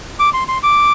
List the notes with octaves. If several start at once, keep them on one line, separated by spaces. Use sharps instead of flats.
D6
C6
C6
D6